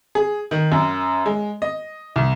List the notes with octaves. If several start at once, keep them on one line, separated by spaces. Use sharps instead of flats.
G#4
D#3
F#2
G#3
D#5
C2